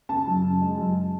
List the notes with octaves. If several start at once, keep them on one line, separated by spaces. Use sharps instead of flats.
C#3 A5
F#2
C#3
G#3
F#2